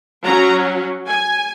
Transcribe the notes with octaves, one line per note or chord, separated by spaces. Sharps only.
F#3 C#4 A#5
G#5